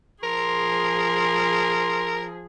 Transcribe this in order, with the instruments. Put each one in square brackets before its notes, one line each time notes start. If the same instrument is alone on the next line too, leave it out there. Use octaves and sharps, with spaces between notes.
[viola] F3 G#4 [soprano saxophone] A#4 [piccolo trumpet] C6